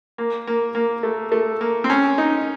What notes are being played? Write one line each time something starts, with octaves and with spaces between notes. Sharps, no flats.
A#3
A#3
A#3
A3
A3
A#3
C4
C#4
D#4